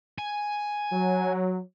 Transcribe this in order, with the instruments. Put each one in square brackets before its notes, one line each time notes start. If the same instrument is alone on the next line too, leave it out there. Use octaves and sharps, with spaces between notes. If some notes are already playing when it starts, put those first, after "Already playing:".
[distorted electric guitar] G#5
[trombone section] F#3